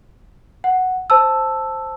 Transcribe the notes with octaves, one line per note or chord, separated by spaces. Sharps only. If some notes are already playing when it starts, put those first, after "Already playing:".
F#5
C5 A5 E6